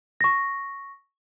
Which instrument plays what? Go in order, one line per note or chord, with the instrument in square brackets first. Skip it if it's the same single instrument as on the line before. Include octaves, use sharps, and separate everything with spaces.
[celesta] C#6 A#6